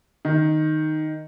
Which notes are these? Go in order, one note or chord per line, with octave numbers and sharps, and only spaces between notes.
D#3